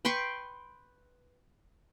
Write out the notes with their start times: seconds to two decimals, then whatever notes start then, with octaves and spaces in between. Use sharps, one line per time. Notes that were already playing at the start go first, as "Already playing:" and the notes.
0.05 B4 G5 C6 C#6